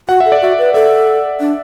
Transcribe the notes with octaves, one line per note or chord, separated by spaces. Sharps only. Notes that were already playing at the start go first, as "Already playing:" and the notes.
F#4 F#5
A4 E5
D5
F#4 E5
B4
A4 E5
D4